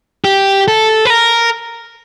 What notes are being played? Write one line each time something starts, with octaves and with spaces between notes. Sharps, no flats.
G4
A4
B4
A#4